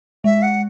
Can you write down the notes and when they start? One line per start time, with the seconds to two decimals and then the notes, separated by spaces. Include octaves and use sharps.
0.24 G#3 E5
0.42 F#5